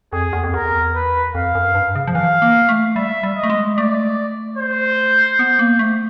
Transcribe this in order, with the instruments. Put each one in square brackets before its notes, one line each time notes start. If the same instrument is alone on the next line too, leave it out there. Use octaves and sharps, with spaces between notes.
[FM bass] F2 [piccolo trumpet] G#4
[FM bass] E2
F2
[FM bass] E2 [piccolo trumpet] A#4
[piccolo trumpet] B4
[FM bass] F2 [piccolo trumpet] F5
[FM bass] F#2
G2
C#3
F3
[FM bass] E3 [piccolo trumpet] F5
[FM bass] A#3
A3
[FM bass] G3 [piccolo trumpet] E5
[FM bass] G3
[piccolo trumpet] D#5
[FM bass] A3
G#3
[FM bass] A3 [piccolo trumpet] D5
[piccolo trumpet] C5
[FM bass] B3
A#3
A3